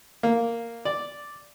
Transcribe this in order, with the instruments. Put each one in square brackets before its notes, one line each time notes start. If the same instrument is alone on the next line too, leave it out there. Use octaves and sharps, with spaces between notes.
[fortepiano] A#3
D5